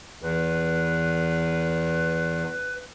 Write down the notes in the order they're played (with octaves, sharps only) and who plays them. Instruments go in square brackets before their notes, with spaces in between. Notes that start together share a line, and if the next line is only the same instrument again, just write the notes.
[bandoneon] E2 [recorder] B4